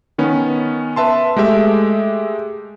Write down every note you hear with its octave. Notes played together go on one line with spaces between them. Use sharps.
D#3 B3 C#4
B4 E5 A5 C6
G#3 A3 G4 E5